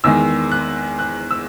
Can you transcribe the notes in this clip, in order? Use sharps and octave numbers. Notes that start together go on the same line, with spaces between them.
E2 D#3 G#3 E6
F#6
F#6
E6